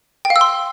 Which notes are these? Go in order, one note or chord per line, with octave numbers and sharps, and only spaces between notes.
G5
F5
E6
C6